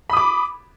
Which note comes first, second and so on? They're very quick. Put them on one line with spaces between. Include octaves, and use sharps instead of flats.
B5 D#6 D6